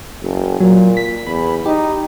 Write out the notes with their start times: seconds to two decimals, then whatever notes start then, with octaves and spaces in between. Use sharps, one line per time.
0.23 F#1
0.60 A#2 F#3
0.97 B6
1.26 E2 B5
1.66 D#4 G4